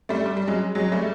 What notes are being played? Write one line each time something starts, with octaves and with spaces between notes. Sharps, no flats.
G3 A3
G3
G3
F#3 G#3
F#3 G#3
G3 A3